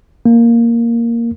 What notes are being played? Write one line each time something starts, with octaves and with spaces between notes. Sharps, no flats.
A#3